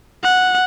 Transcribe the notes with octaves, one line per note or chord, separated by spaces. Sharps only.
F#5